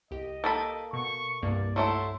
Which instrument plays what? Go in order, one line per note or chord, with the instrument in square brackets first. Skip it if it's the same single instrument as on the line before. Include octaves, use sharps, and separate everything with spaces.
[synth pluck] C2 G4 [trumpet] D#5
[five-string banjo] A#3 A4 B5 [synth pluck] D#6 G6
[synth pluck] B2 [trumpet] C#6
[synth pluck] C2 G2 A#3 [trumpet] D5
[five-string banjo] F#3 A3 E4 [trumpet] C6